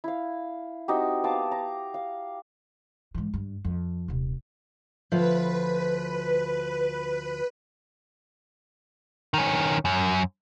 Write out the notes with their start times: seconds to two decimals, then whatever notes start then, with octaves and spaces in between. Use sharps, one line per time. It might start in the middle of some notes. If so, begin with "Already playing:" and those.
0.04 E4 F5
0.88 C4 D#4 F#4 G4
1.24 B3 F5 A5 D6
1.51 A#5
1.94 F5
3.14 G#2 E3
3.34 G2
3.65 F2
4.08 D#1 C3
5.12 D2 F3 B4
9.34 D#3 C#4
9.85 F#2